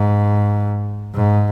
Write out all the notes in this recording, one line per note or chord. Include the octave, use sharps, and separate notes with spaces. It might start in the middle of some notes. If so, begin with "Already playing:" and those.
Already playing: G#2
G#2